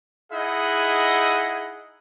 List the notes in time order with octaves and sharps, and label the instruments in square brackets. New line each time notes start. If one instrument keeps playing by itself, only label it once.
[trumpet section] D#4 E4 G#4 D#5 F#5